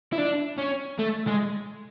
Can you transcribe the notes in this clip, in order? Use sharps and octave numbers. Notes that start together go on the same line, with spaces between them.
E4
D4
C#4
A3
G#3